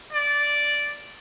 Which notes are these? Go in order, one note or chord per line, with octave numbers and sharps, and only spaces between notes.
D5